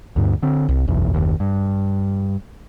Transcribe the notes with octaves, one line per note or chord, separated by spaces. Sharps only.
D2 G2
D3 C4
C2
F#1 B1 E2
F#1 D#2
G2